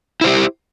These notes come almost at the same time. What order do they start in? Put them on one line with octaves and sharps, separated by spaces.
E4 C5 G4